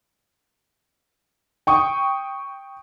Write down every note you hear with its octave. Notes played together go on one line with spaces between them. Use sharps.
G5 C#6 D#6